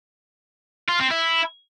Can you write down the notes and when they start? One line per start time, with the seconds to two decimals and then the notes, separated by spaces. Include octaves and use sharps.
0.89 F4
1.00 C4
1.11 E4